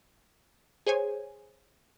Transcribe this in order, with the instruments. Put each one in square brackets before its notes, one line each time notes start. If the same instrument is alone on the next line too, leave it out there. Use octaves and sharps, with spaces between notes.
[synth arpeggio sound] G#4 C5 C#5 G#5